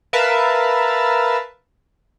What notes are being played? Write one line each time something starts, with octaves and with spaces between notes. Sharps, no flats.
A#4 B4 E5 F5 A5